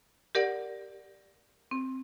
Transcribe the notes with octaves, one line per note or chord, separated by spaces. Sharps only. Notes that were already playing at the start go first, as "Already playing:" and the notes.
G4 A#4 D5 F#5
C4